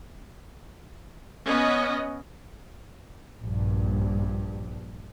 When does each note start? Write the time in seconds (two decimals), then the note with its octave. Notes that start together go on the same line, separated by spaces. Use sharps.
1.47 B3 C#4 D#5
3.41 A#1 G2